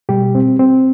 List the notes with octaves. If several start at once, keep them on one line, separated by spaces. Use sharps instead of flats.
B2 G3 G4
C4
C4